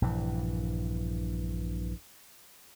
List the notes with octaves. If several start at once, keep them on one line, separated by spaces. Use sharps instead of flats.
A#1 G2 E3